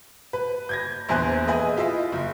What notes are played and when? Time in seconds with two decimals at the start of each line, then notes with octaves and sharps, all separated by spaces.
0.33 B4
0.69 G6 G#6 A#6
1.09 A#1 E2 C5 G#5 F#6 G6
1.47 G#4 B4 D#5 E5 G#5
1.76 E4 F4 D#5 E5
2.12 F#1